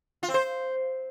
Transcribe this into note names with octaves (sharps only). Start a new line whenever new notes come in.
F4
C4
C5